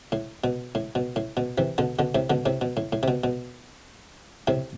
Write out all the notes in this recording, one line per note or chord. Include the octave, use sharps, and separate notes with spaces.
A2
B2
A2
B2
A2
B2
C3 E3
B2 D3
B2 D3
A2 C3
B2 D3
A2 C3
B2
A2
A2
C3
B2
B2
A2 C3